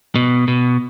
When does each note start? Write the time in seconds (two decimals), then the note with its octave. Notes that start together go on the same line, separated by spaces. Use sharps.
0.15 B2
0.48 B2